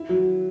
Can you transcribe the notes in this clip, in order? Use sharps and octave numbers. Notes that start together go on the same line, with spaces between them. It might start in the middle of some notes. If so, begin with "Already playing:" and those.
Already playing: E4
F#3